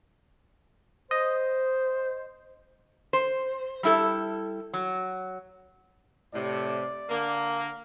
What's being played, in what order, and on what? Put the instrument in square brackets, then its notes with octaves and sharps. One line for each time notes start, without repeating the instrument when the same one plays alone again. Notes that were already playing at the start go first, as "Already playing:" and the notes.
[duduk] C5 [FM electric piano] D#5
[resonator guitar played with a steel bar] C5
G3 E4 A4
F#3
[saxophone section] A2 C3 [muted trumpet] D5
[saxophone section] D3 A#3